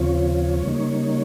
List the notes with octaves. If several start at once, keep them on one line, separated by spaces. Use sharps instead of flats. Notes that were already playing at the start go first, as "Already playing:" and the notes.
Already playing: D#2 C#3 F3 C4 F4 C#5
C#3 G3 A#3 D#4